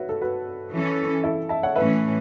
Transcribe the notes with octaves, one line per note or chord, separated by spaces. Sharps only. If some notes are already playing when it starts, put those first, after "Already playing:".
Already playing: F#4 B4 C#5 E5
A4
F#4 B4
E3 C#4 A4
E4 A4
E5 A5
C#5 F#5
A2 E3 C#4 B4 E5